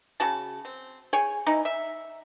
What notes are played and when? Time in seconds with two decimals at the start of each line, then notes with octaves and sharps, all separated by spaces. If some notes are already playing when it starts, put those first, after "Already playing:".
0.20 C#3 F#4 A5
0.65 C4
1.13 G#4 C#5 G5 G#5
1.47 E3 D#4
1.65 E5